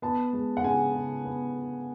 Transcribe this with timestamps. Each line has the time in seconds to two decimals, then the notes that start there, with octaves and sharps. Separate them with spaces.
0.02 B3 A5
0.33 G#3
0.57 F#5
0.64 C#3 G#5
0.94 C#3
1.25 B3